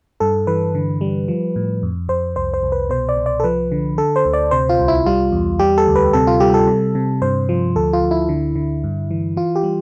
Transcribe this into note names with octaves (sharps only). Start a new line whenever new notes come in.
G2 A4
E3 B4
D3
G3
F3
A2
F2
F2 C5
C2 C5
C5
C2
B4
B2 C5
D5
C2
D5
A4
F3 B4
D3
D3 A4
C5
D2
D5
C3 C5
F4
C2
E4
G3 F4
E2
G3 G4
A4
D2
B4
C3 A4
F4
G3 G4
A4
C3
C3
G2 C5
F3
D2 A4
F4
D2
E4
D3
D3
G2
E3
E3 F4
G4
G3